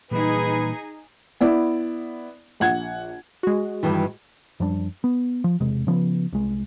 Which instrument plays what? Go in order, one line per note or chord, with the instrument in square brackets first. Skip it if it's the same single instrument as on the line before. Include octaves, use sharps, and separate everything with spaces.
[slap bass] A#2 E3 G3 [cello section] D#4 G#4 [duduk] B4
[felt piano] B3 E4 D5
A#1 F#5 G#6
[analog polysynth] G#3 F#4
[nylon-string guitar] G2 D#3 E3
[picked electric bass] F#2 F3 G3 D4
B3
F3
E1 C3 G#3
C#3 F3 A3 B3
C2 G#3